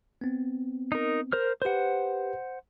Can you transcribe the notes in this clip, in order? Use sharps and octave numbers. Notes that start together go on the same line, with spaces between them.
B3 C4
D#4 A#4
A#4 C5 F6
G4 B4 C5 F#5